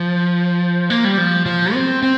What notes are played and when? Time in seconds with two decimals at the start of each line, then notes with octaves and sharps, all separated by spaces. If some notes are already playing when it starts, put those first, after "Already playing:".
Already playing: F3
0.90 A#3
1.04 G3
1.18 F3
1.46 F3
1.74 C4
2.03 C4